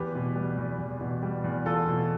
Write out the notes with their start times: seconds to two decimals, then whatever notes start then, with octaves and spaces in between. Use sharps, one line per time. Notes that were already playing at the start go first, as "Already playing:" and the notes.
Already playing: E2 G4 B4
0.15 B2
0.36 G3
0.58 E2
0.79 E2
1.01 B2
1.23 G3
1.44 E2
1.66 E2 F4 A4
1.88 B2